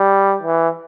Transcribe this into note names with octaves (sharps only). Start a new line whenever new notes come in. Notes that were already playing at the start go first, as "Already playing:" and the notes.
Already playing: G3
E3